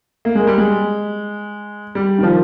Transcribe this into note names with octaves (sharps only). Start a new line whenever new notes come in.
A#3
G#3
G3
G#3
G3
D#3
F3